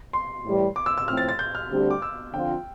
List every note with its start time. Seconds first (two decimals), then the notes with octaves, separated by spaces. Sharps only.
0.13 C6
0.44 A2 E3 G3
0.76 D6
0.86 E6
0.98 E6
1.08 A2 F3 C4 F6
1.17 A6
1.29 A6
1.39 G6
1.55 F6
1.70 D2 D3 G3 C4 G4
1.91 D6
2.02 E6
2.33 D3 F3 C4 F4 G5